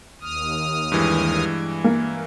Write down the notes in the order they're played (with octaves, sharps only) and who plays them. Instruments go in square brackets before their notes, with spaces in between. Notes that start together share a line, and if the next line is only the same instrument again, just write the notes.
[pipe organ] D#2 D#6 F6
[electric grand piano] G2 E3 G#3
[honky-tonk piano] A#3